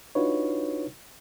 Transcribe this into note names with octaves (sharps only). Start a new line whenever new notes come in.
D4 D#4 F4 F#4 B4 C#5